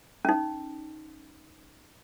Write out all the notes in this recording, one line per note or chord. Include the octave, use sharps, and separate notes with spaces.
C#4 D#4